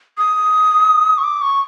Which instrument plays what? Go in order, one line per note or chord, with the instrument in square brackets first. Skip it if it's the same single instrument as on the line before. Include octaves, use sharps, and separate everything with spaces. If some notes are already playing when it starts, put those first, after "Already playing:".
[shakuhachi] D#6
C#6
D6
C#6